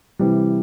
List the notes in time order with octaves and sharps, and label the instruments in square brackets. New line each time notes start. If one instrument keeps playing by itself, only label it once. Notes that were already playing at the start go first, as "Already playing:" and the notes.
[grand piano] C3 E3 G3